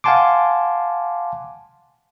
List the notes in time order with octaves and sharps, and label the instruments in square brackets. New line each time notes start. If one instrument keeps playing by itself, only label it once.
[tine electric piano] F5 F#5 G#5 A5 C6 D6